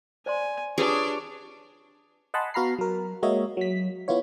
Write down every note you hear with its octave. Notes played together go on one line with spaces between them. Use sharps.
C5 D5 G#5 C6
D4 F4 G4 G#4 B4 C#5 D6
D#5 F#5 G#5 A5 B5 C6
B3 F#4 F5 A#5 B5 C7
F#3 A#4
G#3 A#3 F#4 C#5 D#5 E5
F#3 B6
B3 E4 F4 C#5